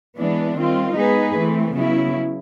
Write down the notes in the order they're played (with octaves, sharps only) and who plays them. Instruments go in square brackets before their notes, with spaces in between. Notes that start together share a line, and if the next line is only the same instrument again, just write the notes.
[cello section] E3 G#3 B3 D4
D#3 G3 C4 F4
G#3 B3 D#4 G#4 B4
E3 A3 C4
C#3 F#3 B3 E4